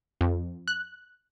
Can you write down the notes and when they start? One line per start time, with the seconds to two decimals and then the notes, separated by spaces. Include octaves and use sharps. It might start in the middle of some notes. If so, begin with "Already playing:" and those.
0.21 F2
0.68 F#6